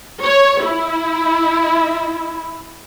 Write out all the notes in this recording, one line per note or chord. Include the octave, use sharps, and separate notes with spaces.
C#5
E4